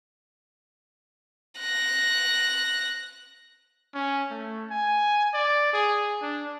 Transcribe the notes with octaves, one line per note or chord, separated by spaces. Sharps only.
F#6 A#6
C#4
A3
G#5
D5
G#4
D4